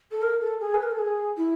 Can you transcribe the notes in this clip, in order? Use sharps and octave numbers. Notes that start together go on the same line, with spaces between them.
A4
A#4
A4
G#4
B4
A#4
A4
G#4
E4